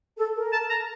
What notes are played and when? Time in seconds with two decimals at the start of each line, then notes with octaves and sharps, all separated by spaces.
0.17 A4
0.35 A#4
0.53 A5
0.70 A#5